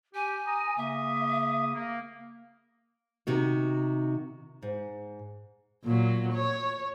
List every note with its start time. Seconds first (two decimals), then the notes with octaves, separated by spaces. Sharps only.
0.14 G4 G#5
0.45 A#5 D#6
0.77 C#3 A#3 E5 D#6
1.74 A#3
3.27 C3 D#3 F#4
4.62 G#2
5.84 A#2 F#3
6.33 C#5